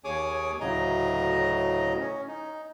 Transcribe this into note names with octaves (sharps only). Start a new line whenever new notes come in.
D#2 G#4 C#5 G#5 D6 D#6
D2 A2 C#3 F#3 D#5 A#5
C#4
D#4